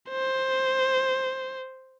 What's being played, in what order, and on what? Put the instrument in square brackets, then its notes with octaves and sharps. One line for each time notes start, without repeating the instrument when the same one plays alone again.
[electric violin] C5